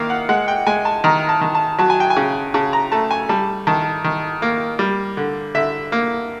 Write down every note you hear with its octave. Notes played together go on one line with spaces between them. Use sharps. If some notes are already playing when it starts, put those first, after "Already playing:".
Already playing: D#3 A#3 F5
F#5
G#3 F#5
G5
G#3 G#5
A5
D#3 A#5
A5
D#3
A5
F#3 A5
G#5
G5
G#5
C#3
C#3 A5
A#5
A3 A5
G#5
G3 A5
D#3 A5
D#3
A#3
G3
D3
D3 E5
A#3